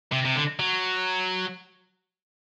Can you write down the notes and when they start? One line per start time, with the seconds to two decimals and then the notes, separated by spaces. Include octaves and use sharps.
0.12 C3
0.25 C3
0.36 D3
0.59 F#3